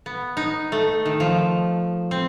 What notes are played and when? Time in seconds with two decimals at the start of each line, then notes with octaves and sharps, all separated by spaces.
0.06 B3
0.37 D#4
0.72 A3
1.06 D#3
1.20 F3
2.11 C4